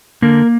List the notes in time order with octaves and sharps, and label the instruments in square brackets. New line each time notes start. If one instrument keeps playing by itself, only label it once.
[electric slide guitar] D3 A#3 A#4